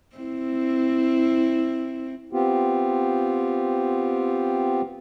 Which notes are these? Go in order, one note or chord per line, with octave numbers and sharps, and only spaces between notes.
C4 E4
B3 C4 F4 G4